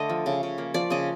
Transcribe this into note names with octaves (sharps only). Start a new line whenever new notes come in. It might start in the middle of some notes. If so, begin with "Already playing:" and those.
Already playing: D3 A3 D#5
F3
C#3
C#3
A#3
F3 D5
C#3 D#5